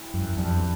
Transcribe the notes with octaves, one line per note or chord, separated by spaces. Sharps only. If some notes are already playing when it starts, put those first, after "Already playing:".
Already playing: C#4 E4 G4
F#2
F2 D4 G4 B4